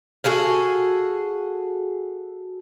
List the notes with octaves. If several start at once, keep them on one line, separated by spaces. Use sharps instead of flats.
F#4 G#4 A4 F5